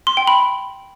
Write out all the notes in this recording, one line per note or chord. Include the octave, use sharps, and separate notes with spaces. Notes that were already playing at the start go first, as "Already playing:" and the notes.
C6
G5
B5